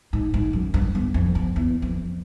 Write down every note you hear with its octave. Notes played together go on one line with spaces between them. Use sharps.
G#2
G#2
F#2
G2
E2
F2
E2
E2
F2